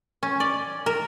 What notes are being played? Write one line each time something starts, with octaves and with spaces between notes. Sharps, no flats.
C#4
D5
A#4